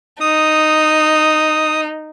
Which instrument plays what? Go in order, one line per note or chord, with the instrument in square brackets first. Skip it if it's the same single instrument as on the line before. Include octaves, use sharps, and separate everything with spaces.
[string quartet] D#4 [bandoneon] D#6